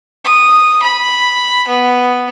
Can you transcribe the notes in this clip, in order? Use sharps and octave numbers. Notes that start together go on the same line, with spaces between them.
D#6
B5
B3